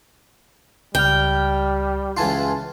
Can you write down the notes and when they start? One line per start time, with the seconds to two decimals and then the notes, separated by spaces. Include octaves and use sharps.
0.95 C#2 G3 G5 F6
2.17 C#2 E3 F4 G#5 A5 C6